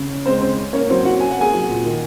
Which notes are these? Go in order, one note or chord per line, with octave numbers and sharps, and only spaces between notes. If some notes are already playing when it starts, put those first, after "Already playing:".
Already playing: C#3
C#4
G#3 C4 C5
C#3 C4 C5
C#4
A#3 C#4 C#5
F#3 C4 C5
C3 F#4 F#5
C#4 G#5
F#5
A#3 G#4 G#5
F#3
A#2
D#3